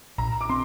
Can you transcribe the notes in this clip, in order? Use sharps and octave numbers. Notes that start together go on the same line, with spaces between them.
A#1 A#5
D6
C4 C6